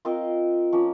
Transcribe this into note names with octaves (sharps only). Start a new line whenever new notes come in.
C4 F4 A#4 D#5
F3 A#3 C#4